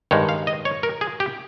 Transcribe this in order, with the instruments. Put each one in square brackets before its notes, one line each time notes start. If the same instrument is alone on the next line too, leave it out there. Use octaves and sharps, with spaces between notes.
[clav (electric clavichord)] G2 D#3 G#3 C#5
F5
D#5
C#5
A#4
G#4
G4